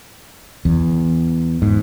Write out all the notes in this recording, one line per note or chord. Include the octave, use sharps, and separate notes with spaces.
E2
G#2